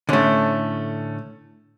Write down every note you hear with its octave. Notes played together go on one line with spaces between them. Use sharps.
A2 D3 A3 C#4